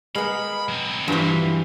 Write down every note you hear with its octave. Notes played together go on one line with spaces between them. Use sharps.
G#3 B3 A#4 F5 F#5 B5
F#3 C4
G2 E3 F3 F#4 C5